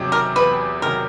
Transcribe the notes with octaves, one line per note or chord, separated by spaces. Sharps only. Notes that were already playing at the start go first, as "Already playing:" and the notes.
Already playing: E2 C3 D#3 F#3
A#4
E2 B4
C3 D#3 F#3 A#4